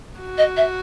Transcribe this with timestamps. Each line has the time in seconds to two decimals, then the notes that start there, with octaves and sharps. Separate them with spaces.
0.20 F#4
0.38 D#5
0.57 E5